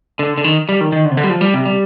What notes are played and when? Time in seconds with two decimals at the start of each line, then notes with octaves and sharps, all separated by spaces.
0.19 D3
0.38 D3
0.44 D#3
0.69 G3
0.81 D#3
0.92 D#3
1.05 D3
1.11 C3
1.17 D3
1.23 G3
1.30 F3
1.41 G3
1.54 C3
1.65 G3